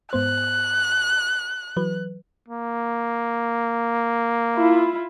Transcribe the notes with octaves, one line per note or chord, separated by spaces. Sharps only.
G#2 B3 C5 F#6
E3 F#3 B4
A#3
E4 F4